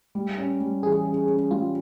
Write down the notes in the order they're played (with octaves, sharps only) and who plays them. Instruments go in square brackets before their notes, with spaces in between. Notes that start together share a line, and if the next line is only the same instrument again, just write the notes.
[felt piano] G3
C#4
G3
[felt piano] E3 [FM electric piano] G#4
[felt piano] C#4
C#4
[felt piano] G3 [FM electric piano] F4